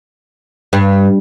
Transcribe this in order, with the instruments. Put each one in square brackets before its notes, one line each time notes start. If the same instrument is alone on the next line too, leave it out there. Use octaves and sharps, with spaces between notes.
[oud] G2